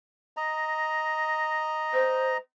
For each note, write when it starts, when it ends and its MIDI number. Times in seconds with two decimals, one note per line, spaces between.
0.37 2.37 75
0.37 2.37 82
1.94 2.34 72